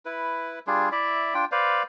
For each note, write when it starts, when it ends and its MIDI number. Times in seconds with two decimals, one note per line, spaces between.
0.05 0.59 64
0.05 0.59 71
0.67 0.89 55
0.67 0.89 62
0.67 0.89 65
0.67 0.89 68
0.92 1.34 64
0.92 1.34 74
0.92 1.34 76
1.34 1.45 62
1.34 1.45 65
1.34 1.45 79
1.52 1.83 71
1.52 1.83 72
1.52 1.83 74
1.52 1.83 77